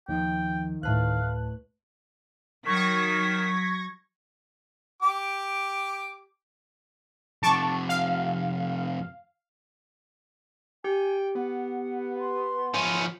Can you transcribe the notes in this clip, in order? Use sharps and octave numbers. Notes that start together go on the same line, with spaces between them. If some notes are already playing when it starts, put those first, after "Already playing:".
D#2 D#3 F3 G5
D2 A2 B4 F5 A5 F#6
D#3 F#3 C#6 G#6 A#6 B6
G4 D6
F2 C3 A5 C#6 D6
F5
G4 G5 G#5
B3 F#5
C6
F3 C#4 B5